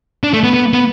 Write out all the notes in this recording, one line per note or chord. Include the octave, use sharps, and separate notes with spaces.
D4
A3
B3
B3
B3